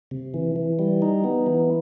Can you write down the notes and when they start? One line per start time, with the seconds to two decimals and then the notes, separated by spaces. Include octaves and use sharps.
0.11 C3
0.34 E3
0.56 E3
0.79 G3
1.02 D#4
1.24 B3
1.46 E3